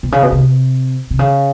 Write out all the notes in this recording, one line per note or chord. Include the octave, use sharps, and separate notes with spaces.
B2
C#3
B2
C3
C3
C#3